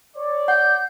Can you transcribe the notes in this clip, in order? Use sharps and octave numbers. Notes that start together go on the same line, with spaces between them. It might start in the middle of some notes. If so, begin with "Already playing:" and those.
C#5 D5
F#5 G6